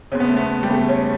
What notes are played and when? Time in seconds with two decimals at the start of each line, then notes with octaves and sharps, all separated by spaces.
0.12 F#1 E2 C#3 C#4
0.20 B3
0.28 A3
0.37 B3
0.63 G3
0.70 F#1 E2 C#3 A3
0.89 C#4